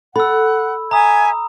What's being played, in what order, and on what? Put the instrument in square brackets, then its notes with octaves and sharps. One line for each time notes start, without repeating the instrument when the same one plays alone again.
[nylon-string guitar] A4 [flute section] F#5 [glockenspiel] B5 E6
[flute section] E5 G#5 G#6 [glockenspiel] A#5 D#6